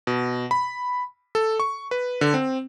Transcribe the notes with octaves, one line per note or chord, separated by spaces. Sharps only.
B2
B5
A4
C#6
B4
D3
C4